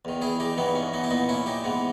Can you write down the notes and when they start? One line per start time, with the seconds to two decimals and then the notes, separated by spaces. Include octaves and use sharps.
0.05 E2 D#3
0.21 E4 G#4
0.40 D#4 G4
0.57 G2 E3 B3 D#4
0.75 C#4
0.93 B3 D#4
1.04 E4
1.10 A#2 B3 D#4
1.29 C#4 E4
1.46 D#4 G4
1.64 G#2 E3 B3